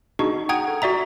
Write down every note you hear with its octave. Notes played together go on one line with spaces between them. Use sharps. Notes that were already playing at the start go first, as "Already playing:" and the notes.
D4 D#4 F#4 G#4 D#5 C#6
F#5 G5 A#5 D#6 G#6
A4
F#4 D5 E5 A#5